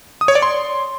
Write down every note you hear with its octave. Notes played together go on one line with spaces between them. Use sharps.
D#6
C#5
D5
C6